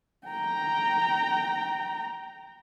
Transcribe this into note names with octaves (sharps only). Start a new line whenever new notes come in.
G5 A#5